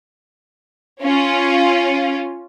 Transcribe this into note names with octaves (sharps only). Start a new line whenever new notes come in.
C#4 F4